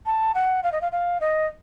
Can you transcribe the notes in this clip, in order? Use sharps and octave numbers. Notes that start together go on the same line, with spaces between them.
A5
F#5
F5
D#5
F5
F5
D#5